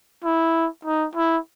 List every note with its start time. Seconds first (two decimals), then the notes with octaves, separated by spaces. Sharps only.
0.24 E4
0.85 D#4
1.16 E4